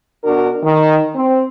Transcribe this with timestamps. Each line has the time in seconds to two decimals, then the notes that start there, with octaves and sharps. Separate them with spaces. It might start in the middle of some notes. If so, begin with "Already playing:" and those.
0.24 B2 D4 F#4 A#4
0.63 D#3
1.15 C4